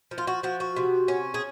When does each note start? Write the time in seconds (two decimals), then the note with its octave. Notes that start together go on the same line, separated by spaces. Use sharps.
0.11 F3
0.18 F4
0.27 F#4
0.43 F3 F#4
0.60 F#4
0.76 C3
1.08 C#4
1.34 G#4